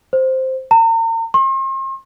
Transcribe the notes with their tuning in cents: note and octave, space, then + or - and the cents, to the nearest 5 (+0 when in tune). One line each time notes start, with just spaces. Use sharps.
C5 +0
A#5 -40
C6 +40